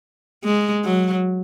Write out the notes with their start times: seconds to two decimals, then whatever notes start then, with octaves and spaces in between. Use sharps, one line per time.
0.44 G#3
0.84 F#3